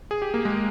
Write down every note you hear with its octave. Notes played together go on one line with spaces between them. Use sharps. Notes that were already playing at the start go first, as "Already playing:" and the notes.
G#4
G4
A#3
G#3